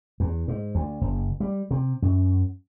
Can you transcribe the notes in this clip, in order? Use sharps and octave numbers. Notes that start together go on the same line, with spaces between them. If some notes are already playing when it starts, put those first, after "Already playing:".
E2
G#2
D2
F#1
G3
C3
F#2